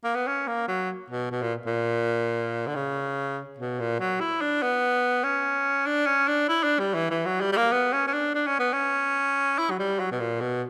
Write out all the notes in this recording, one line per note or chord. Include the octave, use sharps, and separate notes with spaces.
A#3
B3
C#4
A#3
F#3
B2
B2
A#2
A#2
D3
C#3
B2
A#2
F#3
E4
D4
B3
C#4
D4
C#4
D4
E4
D4
G3
E3
E3
F#3
G3
G3
A#3
B3
C#4
C#4
D4
D4
C#4
B3
C#4
E4
F#3
G3
F#3
B2
A#2
B2